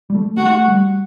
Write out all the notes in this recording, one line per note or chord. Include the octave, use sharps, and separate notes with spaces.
G3
A3
A3 F#4
G3